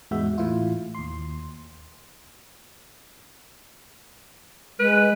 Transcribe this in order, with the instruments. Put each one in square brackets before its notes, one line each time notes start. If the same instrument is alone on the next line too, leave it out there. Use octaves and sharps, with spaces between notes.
[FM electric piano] E2 G#2 G#3 B3 F#4 E5
A2 E3 E4 F4
D#2 C6
[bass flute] G#3 [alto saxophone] B4